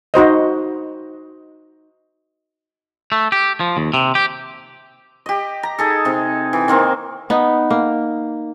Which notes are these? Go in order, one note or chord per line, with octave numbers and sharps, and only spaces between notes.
D#4 F#4 C5 D#5
A3
G4
F3
D#2
C3
G4
G4 D#5
A#5
D#4 G#4 A4
C3 D#4
E3
D#3 A#3 C4 D#4
B3 D#4
A#3